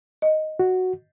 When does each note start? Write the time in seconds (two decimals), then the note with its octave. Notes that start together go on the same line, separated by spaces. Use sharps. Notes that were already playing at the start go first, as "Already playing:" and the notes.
0.22 D#5
0.59 F#4